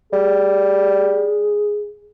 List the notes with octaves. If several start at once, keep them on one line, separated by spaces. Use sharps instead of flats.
G3 G#4